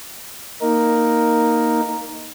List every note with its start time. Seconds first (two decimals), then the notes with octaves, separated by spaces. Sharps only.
0.61 A#3 D#4 A#4